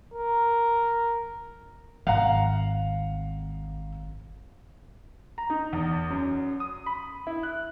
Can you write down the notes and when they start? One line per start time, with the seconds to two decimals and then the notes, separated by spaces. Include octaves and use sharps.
0.14 A#4
2.07 G#1 F5 F#5 A#5
5.38 A#5
5.50 D#4
5.73 E2
6.10 F#2
6.60 D#6
6.86 B5
7.27 E4
7.43 F#6